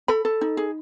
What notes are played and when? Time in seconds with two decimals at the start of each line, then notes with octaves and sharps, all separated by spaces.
0.08 A4 B5
0.25 A4
0.41 D#4
0.57 G#4